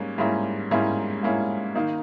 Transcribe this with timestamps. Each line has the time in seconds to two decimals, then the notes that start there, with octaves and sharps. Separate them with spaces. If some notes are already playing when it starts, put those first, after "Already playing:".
Already playing: G#2 G3 A#3 C#4
0.18 G#2 G3 A#3 C#4 E4
0.71 G#2 G3 A#3 C#4 E4
1.23 G#2 G3 A#3 C#4 E4
1.75 D#3 A#3 D#4